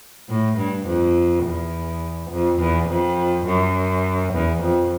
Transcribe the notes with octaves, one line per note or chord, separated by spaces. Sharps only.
A2
G2
F2
E2
F2
E2
F2
F#2
E2
F2